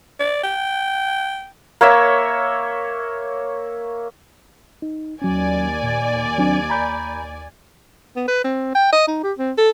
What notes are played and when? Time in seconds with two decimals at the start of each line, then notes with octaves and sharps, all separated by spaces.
0.20 D5
0.43 G5
1.81 A#3 C#5 E5
4.82 D#4
5.22 D#2 F#3 C#4 D5 G#5
5.83 A#2
6.38 F#3 C4 D4
6.70 A#5 B5 G6
8.16 B3
8.28 B4
8.44 C4
8.75 G5
8.93 D#5
9.08 D#4
9.23 G4
9.38 C4
9.58 A4